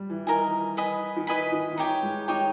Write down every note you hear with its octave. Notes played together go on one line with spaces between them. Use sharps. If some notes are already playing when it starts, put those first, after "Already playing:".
Already playing: G3
E3
D#3 A#4 D#5 G#5
B4 D#5 G#5 B5
D#3
E3 B4 D#5 G#5 B5
D#3
D#3
E3 D#4 G4 C#5 G5
G#3
D#3 D#4 G4 C#5 G5